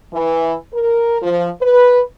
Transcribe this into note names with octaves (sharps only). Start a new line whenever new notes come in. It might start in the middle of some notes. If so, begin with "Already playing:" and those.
E3
A#4
F3
B4